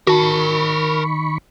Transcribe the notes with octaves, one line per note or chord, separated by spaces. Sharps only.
D#3 F#4 A#4 A5 B5 C#6